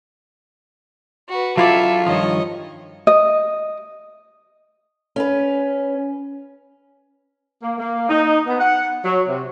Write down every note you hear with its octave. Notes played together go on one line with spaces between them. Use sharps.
F#4 B4
F#3 E4 F4 A4 D5 E5
G2 D#3 F3 C#5 D#5
D#5
C#4 B4
A#3
A#3
D#4
B3
F#5
F#3
C3